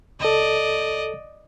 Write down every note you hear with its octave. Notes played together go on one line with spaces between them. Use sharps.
C#2 A4 D5 D#5